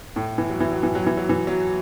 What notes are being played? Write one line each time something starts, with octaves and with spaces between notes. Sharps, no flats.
A2
E3
F#3
E3
F#3
E3
F#3
E3
F#3
E3
F#3